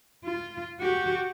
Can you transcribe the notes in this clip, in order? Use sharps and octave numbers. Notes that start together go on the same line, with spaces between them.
F4
F#4 G4